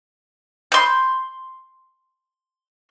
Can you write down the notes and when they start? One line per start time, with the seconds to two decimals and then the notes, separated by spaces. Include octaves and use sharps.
0.72 C6 G6